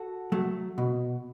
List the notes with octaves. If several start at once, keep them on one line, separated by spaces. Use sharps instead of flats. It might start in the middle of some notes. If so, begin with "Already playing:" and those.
Already playing: F#4 A4
F#3 A3
B2